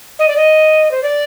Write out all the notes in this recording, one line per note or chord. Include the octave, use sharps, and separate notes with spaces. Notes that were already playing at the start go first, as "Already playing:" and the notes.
D#5
D5
D#5
C5
D5